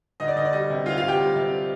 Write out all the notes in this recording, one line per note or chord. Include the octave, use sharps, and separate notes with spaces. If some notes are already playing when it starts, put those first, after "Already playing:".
D2 D#5
D5
D2 D#5
D5
G3 D#5
C3
D2 F4 F5
F4 F5
D2
G4 G5
G3
C3